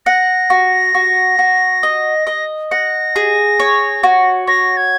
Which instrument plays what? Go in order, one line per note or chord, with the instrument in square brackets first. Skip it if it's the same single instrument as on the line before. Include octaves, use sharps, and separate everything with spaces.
[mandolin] F#5 [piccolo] A#6
[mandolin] F#4
F#4
F#4
D#5
D#5
[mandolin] F#5 [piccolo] A#6
[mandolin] G#4
C#5
F#4
[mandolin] C#5 [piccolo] A#6
[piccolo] G#6